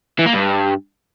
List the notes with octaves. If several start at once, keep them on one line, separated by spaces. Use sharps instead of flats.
E3
A#3
G2